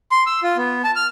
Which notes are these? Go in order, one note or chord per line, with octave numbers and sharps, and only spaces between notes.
C6
E6
F4
B3
A5
F6